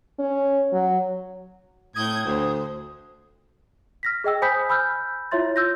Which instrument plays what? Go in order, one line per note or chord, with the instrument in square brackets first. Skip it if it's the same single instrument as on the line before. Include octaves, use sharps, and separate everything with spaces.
[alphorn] C#4
F#3
[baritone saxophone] A2 [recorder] D#6 [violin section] G6 G#6
[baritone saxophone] D2 [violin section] C5
[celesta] F6 A#6 B6
G#4 D#5 G5 E6
C5 G#5 B5 D#6 G6 B6
G#5 B5 E6 F6 G6
E4 F4 C#5 E5 C6 A6
E6 G6 A#6